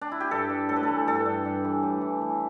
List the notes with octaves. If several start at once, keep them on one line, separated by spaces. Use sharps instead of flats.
D4
E4
G4
G2 A4
G2
A2 A4
B4
E3 A4
G2 A4
G2
G2
E3
A2
E3
E3